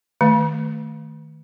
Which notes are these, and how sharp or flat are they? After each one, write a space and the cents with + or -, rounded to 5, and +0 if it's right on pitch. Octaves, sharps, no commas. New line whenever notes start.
D#3 +0 A3 +0